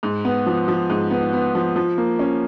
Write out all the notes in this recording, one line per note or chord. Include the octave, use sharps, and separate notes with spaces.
G#2
B3
F3
F3
G#2
B3
B3
F3
F3
A#3
C#4